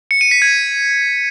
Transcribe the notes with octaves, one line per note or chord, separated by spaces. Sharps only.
C#7
D#7
B6
G#6